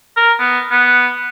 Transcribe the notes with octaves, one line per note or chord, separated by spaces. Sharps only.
A#4
B3
B3